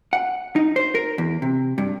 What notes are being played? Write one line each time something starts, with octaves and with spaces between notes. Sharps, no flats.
F#5
D#4
C5
A#4
E2
C3
G2